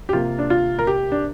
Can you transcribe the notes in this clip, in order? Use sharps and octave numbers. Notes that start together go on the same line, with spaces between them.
G4
C3 A#3 F4
D4
F4
A#4
G4
D4